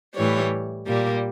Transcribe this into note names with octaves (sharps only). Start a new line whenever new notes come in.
A2 E3 G3 C#5
A#2 G3 A#3